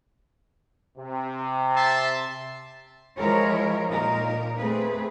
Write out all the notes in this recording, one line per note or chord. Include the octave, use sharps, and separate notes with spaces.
C3
E5 A5 C6
F3 G#3 E4 A#4 C#5
A#2 D#4 A#4
A3 C4 G#4 B4